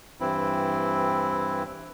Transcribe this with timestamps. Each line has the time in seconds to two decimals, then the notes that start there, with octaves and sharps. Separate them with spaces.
0.20 G2 E3 C4 E4